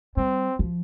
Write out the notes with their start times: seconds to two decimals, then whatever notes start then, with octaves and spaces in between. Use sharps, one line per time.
0.17 G3 C4
0.59 F3